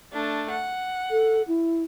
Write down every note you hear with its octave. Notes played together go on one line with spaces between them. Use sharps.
A3 D4
F#5
A4
E4